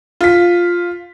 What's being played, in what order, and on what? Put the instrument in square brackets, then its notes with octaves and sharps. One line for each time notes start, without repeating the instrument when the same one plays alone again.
[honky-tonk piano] F4 B6